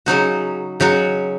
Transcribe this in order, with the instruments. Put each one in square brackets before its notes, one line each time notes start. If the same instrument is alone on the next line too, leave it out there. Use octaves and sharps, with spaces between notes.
[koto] C#3 F#3 D#4 F#4
C#3 F#3 D#4 F#4